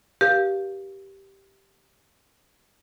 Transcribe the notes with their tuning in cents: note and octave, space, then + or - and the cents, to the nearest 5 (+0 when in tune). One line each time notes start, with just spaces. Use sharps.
G4 -5 A#4 +45 F5 +0